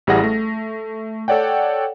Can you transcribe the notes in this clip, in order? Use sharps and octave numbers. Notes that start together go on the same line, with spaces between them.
A1 G3 E4 G#4 F#5 A#6
A3
A4 C#5 D5 F#5 G5